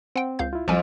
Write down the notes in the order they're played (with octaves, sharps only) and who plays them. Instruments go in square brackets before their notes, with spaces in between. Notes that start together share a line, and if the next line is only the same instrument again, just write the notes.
[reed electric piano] C4 [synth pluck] F#5 G5
[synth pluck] C#2 F5 G6
[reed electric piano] E4 F4
[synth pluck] C2 G#5 [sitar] F2 [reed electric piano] F#3